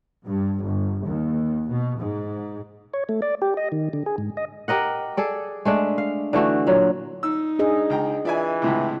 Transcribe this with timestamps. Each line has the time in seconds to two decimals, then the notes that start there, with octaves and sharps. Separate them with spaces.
0.24 G2
0.61 G1
1.05 D#2
1.69 B2
1.98 G#2
2.94 C#5
3.09 A3
3.22 D5
3.42 G4
3.57 D#5
3.72 D#3
3.93 D3
4.06 G#4
4.18 G#2
4.37 D#5
4.68 G4 A#4 D#5 F#5
5.17 G#4 A4 D5
5.65 G#3 A3 D4
5.98 F5
6.33 D3 E3 A3 F#4
6.67 A#2 F#3
7.23 D#4 E6
7.59 D4 G#4 D#5
7.90 C#2 G5 A#5
8.25 E3 F4 D5 E5 G#5
8.62 C#2 A2 C3 E4